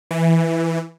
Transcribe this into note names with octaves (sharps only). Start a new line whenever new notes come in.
E3